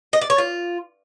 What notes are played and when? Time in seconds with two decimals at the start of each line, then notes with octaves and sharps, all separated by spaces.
0.13 D#5
0.21 D5
0.30 C#5
0.38 F4